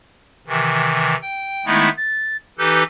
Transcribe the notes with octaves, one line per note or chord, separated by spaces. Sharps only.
C3 D#3 E3
G5
D#3 G#3 A3 B3 D#4 E4
A6
E3 D#4 G4 A4 B4 G6